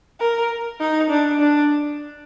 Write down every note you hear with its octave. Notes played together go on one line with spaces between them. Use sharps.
A#4
D#4
D4
D4